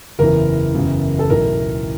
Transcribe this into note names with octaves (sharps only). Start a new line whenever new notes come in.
F#1 E2 C#3 E3 A#4
F#1 E2 C#3 E3
A4
B1 A2 E3 A#4